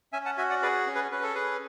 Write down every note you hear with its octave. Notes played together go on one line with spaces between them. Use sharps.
C#4 E5 G#5
F#5 A5
F#4 E5 G#5
D5 F#5
G#4 B4 D5
C#4
G#4 B4
C#4 B4
A4
G#4 B4